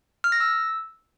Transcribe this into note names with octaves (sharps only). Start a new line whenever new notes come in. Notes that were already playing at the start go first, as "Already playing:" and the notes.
F6
A#6
E6